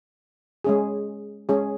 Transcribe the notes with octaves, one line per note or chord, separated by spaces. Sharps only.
G#3 C#4 G#4
G#3 C#4 G#4